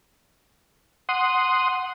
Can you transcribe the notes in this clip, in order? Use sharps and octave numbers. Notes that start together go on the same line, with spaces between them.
F#5 C6 D#6